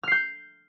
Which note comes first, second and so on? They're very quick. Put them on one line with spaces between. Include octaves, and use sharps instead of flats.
F6 C7 G6